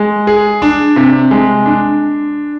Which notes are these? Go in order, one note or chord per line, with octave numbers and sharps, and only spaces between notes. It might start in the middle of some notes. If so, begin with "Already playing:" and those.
Already playing: G#3
G#4
D4
C3
G#3
D4